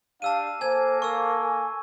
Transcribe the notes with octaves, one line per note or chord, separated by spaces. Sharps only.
D4 G4 F5 A5 E6 D#7
A#3 A4 C5 G#5 G#6
A#4 C#6 E6
G#5